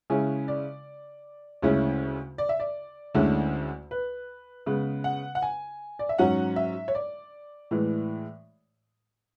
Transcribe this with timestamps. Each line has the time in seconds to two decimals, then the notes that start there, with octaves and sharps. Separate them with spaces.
0.10 C#3 G#3 C#4 E4 G#5
0.48 D5
1.62 D2 C#3 G#3 C#4 E4
2.38 D5
2.49 E5
2.60 D5
3.14 D2 D3 G#3 C#4 E4
3.91 B4
4.66 C#3 G#3 B3 B4
5.04 F#5
5.35 F#5
5.42 G#5
5.99 D5
6.09 E5
6.18 G#2 F#3 C#4 F#5
6.56 E5
6.88 C#5
6.95 D5
7.71 A2 E3 G#3